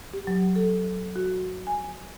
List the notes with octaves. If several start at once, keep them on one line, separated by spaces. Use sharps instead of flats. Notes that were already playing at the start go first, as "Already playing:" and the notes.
G4
F#3
A4
F#4
G#5